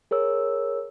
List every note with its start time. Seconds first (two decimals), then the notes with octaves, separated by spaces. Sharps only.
0.11 G#4 A#4 C#5 E6